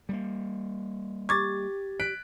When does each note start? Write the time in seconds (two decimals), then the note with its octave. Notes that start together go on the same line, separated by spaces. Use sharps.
0.09 G3 G#3 A#3
1.29 G4 C#6 D6 G#6 A6
2.00 F#6 B6 D7